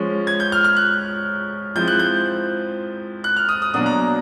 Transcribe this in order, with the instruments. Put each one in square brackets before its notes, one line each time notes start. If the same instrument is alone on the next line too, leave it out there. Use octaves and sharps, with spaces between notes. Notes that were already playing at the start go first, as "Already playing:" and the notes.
Already playing: [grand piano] F3 G#3 C#4
G#6
G6
F6
F6
F#6
F3 G#3 C4 E4 G6
F#6
G6
F#6
F6
D#6
D#6
B2 F#3 A#3 D4 D#6
A#5